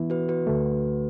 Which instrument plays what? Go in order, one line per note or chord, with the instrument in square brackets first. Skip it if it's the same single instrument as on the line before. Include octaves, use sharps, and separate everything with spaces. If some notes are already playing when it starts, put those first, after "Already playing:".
Already playing: [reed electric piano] E3 B3 E4
[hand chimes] F#4 B4
F#4 B4
[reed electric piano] D2 D3 A3